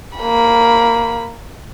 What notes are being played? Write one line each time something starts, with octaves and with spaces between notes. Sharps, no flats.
A#3 B5